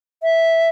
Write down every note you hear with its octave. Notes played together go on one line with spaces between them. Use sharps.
E5